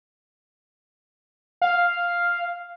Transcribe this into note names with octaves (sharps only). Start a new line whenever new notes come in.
F5